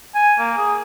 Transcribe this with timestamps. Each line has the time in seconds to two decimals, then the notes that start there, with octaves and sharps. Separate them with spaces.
0.15 G#5
0.39 A#3
0.58 G#4